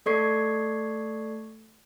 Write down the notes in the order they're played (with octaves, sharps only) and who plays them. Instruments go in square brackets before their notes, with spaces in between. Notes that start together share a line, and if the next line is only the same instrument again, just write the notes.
[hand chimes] A3 A4 D5 C#6 G#6 C7